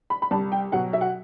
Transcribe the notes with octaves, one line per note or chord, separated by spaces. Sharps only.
B5
B5
C2 A5
G5
B2 F#3 F#5
E5
F#5